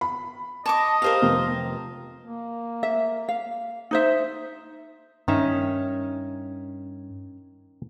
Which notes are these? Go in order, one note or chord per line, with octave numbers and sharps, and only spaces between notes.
B5
D#5 A5 C#6 D6
G4 A#4 C5 F5
F1
A#3
E5
F5
D#4 C5 E5
G2 D#3 C#4 D#4 E5